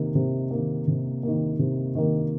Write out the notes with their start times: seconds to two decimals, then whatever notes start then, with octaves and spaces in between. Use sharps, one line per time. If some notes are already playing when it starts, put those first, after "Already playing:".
Already playing: C3 D#3 A#3
0.15 C3
0.51 D#3 A#3
0.87 C3
1.23 D#3 A#3
1.59 C3
1.95 D#3 A#3